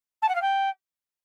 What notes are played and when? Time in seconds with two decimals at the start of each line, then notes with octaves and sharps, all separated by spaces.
0.22 A5
0.28 F#5
0.35 F5
0.41 G5